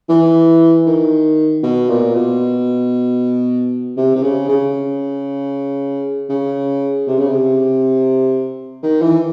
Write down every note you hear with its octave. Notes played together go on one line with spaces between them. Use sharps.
E3
D#3
B2
A#2
B2
C3
C3
C#3
C#3
C#3
C3
C#3
C3
D#3
E3